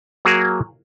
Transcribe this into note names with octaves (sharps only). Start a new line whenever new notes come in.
F#3 A#3 F#4 G#4 A#4